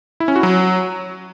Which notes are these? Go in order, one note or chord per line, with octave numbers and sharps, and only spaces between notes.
E4
C#4
F#4
F#3